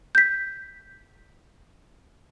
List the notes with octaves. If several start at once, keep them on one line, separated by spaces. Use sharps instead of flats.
G6 B6